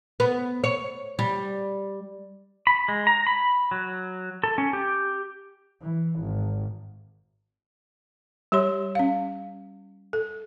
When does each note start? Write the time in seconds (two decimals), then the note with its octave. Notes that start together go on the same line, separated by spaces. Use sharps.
0.20 B3
0.64 C#5
1.19 G3
2.67 B5
2.88 G#3
3.07 A#5
3.27 B5
3.71 F#3
4.44 A4
4.58 C#4
4.73 G4
5.81 E3
6.20 G#1
8.52 G3 G4 C#5 C6
8.95 C#4 F5
10.13 A4